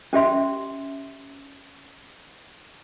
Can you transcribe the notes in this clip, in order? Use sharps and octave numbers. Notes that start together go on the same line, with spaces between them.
C#4 G4 E5 C6